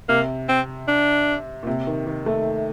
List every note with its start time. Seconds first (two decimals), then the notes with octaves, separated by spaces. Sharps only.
0.09 C3 A#3
0.49 C4
0.88 D4
1.63 A#2
1.67 C3
1.87 D#3
2.07 D#3
2.26 A3